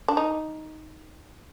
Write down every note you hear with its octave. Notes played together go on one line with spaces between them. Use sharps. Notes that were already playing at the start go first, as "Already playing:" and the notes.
D4
D#4